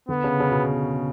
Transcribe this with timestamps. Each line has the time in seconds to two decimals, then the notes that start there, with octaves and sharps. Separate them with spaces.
0.09 D3 B3
0.24 C#3
0.40 C#3
0.51 B2